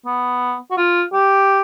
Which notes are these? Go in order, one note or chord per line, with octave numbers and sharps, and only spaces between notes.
B3
F#4
F4
G4